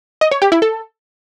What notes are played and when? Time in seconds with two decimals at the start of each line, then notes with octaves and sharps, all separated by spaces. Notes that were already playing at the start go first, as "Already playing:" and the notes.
0.21 D#5
0.31 C#5
0.42 G4
0.52 E4
0.62 A4